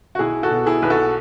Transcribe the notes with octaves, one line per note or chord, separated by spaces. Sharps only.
F#4
B1 E4 G#4
F#4 A4
B2
E4 G#4
B1 B4
F#4 A4